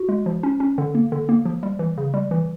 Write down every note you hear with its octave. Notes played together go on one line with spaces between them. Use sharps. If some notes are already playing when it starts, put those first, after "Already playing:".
Already playing: F#4
G#3
F3
C#4
C#4
D3
A#3
D3
A#3
F3
G3
E3
C#3
G3
E3